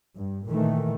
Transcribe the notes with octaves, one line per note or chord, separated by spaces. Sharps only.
G2
A#2 D#3 E3 A3